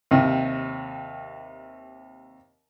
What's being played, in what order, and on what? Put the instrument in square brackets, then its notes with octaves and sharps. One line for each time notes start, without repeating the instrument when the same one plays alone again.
[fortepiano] D#2 C3